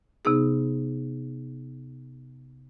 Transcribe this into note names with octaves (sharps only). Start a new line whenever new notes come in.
C3 B3 D#4 G#4